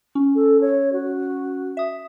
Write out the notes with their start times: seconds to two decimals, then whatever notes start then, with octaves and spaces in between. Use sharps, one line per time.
0.15 C#4
0.35 A4
0.61 C#5
0.92 F#4
1.77 E5 D#6